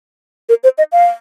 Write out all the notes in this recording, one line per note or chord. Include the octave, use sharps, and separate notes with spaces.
A#4
C5
D#5
F5